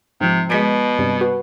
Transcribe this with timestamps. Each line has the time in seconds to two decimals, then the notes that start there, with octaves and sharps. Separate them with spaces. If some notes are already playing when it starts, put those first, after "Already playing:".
0.21 G#2 C3 F3
0.50 B2 G#3 B6 D7
0.99 G2 C3 G3
1.21 F#4 B4